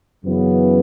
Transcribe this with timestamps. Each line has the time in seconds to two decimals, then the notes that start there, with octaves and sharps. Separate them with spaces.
0.24 F#2 C#3 E3 B3